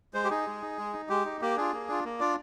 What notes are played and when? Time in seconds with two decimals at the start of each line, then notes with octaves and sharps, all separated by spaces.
0.14 G#3 C5
0.24 G4
0.30 D#4 G#4
0.47 G#3
0.62 D#4
0.78 G#3
0.93 D#4
1.09 G#3 G4
1.25 D#4
1.41 A#3 G4
1.57 D4 F4 G#4
1.73 A#3
1.89 D4 F4
2.04 A#3
2.20 D4 F4 D5